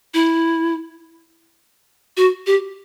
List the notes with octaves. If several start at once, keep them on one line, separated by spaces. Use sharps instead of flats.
E4
F#4
G4